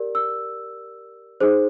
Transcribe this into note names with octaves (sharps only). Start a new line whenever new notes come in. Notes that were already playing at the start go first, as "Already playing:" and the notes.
Already playing: G4 A#4 D5
E6
D#4 G#4 C5